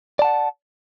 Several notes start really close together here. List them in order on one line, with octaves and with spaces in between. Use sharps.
D5 A5 F#5